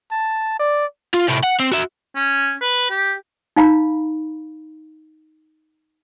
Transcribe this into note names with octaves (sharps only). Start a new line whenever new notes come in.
A5
D5
F4
A2 C3
F#5
C4
F#4 E5
C#4
B4
G4
D#4 F5 A#5 B5